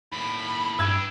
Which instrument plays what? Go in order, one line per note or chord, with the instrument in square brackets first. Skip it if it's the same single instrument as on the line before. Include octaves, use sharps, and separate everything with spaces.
[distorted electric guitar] D#2 A2 [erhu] B5
[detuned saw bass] G2 [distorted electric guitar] B4 G5 [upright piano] E6 G#6